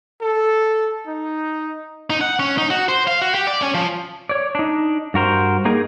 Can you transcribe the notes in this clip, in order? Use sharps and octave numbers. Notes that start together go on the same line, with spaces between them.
A4
D#4
D#4
F#5
C#4
D#4
F#4
C5
F5
F#4
G4
D5
C#4
F3
C#5 D5
D4 D#4
G2 F#4 A#4 C5
A#3 D#4 G#4 A#4 G#5